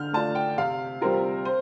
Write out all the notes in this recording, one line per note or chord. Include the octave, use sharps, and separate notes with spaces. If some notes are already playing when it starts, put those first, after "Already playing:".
Already playing: D3 F6 G6
A3 D4 F4 A5
G5
C3 F5
G3 C4 F4 A#4
C5